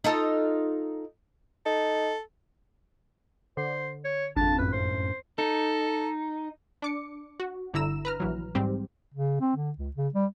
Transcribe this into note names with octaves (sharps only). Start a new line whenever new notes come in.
D#4 F4 A4
D#4 A4
D3 C5
C#5
G#1 F2 D4 A5
F#2 A2 C#4 B4
C5
D#4 A4
D4 D6 C#7
F#4
G1 D3 E4 A#5 E6 E7
B4 A#5 F6
A#1 E3 F#3
G#2 G3 C4 G4
C#3
C4
D3
C#2
C#3
G3